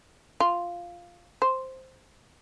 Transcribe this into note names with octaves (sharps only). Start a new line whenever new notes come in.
F4
C5